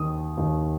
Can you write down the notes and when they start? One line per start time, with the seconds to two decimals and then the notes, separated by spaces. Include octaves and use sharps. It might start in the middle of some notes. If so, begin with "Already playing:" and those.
Already playing: D#2 D#3 D#6
0.37 D#2 D#3